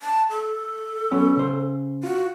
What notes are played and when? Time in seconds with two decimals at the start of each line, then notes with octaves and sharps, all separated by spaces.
0.01 A5
0.30 A4
1.11 F#3 B3 C#4
1.37 C#3 C5
2.03 F4 F#4